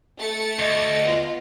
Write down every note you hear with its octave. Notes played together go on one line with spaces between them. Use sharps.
A3 A6 C#7
D2 D#5
B3 F4